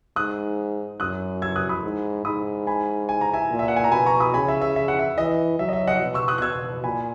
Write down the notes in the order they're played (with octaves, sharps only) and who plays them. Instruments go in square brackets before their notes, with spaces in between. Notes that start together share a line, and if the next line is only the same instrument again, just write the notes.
[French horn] G#2 [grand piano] D#6 F#6
[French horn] F#2 [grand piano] D#6 F#6
[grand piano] E6 G#6
D#6 F#6
B5 D#6
[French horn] G#2
[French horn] G#2 [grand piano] B5 D#6
[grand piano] G#5 B5
G#5
A#5
E5 G#5
[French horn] A#2
[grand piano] E5
F#5
G#5
A#5
[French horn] B2 [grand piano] G#5 B5
[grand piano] A#5 C#6
B5 D#6
[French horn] C#3 [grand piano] G#5 B5
[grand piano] E5
E5
E5
F#5
E5
[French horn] E3 [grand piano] D#5
[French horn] F#3 [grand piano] E5
[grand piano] D#5
E5
D#5 F#5
[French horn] B2
[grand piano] C#6 E6
D#6 F#6
F#6
[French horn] B2 [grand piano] E6 G#6
[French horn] A#2 [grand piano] G#5 B5